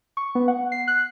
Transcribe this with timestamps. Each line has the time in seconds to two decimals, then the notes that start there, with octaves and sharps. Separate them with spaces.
0.17 C#6
0.35 B3
0.48 F#5
0.72 C7
0.88 F#6